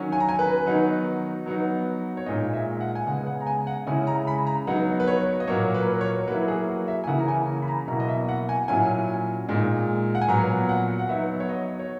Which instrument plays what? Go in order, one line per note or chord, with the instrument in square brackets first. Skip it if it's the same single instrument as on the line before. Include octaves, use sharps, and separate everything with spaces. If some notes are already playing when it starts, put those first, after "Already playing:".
Already playing: [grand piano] D#3 F#3 C#4
G#5
A#5
G#5
B4
D#3 F#3 B3 D#4
F#3 B3 D#4
C#5
A#2 G#3 D#4 D#5
E5
F#5
G#5
C#3 G#3 B3 F#5
F#5
A#5
G#5
F#5
C#3 G#3 C#4 E4 G#5
A#5
B5
A#5
F#3 B3 D#4 F#5
B4
C#5
D#5
A#2 F#3 A#3 C#5
B4
C#5
F#3 A#3 E4 B4
G#4
F#4
E5
G#5
C#3 E3 A#3 F#5
A#5
G#5
B5
A#5
B2 F#3 A#3 E4 A#5
D#5
E5
F#5
G#5
A#2 F#3 C#4 E4 G#5
A#2 G#3 D#4
F#5
G#5
A#2 F#3 B3 A#5
F#5
F#5
F#3 B3 D#4 E5
C#5
D#5
C#5